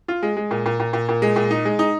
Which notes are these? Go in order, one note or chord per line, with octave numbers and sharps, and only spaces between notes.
F4
G#3
G#3
A#2
A#2
A#2
A#2
A#2
G#3
A#2
D#4
G#3
D#4